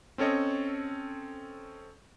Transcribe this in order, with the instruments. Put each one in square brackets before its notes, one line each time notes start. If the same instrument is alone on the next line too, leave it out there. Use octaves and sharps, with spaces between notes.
[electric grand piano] C4 C#4 A4 C#5 D#5